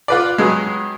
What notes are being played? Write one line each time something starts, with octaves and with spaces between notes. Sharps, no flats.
F4 B4 D5
G2 F#3 G#3